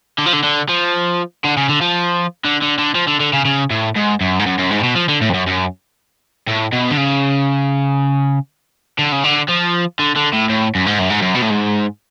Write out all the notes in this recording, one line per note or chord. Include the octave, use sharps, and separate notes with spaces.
D3
F3
D3
D3
F3
D3
C#3
D3
F3
D3
D3
D3
F3
D3
D3
C#3
C#3
A2
G#2
F#2
G#2
F#2
F#2
G#2
A2
B2
F3
D3
A2
F2
F#2
F#2
A2
B2
D3
C#3
D3
C#3
D3
F3
D3
D3
A2
A2
F#2
G#2
F#2
G#2
F#2
B2
A2
G#2